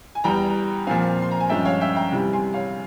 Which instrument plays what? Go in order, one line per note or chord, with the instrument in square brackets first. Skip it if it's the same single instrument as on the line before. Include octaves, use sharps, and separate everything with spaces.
[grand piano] G#5
E2 E3 G3 G5 A#5
A#2 F3 C4 F5 G#5
C6
A#5
G#5
G2 F3 G#3 C#4 E5 G5
C#5 F5
E5 G5
G5 A#5
C3 E3 G3
G#5 C6
C#5 F5